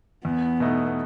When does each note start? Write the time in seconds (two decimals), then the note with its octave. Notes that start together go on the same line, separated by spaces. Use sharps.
0.25 E2 B3
0.60 B2 A3 D#4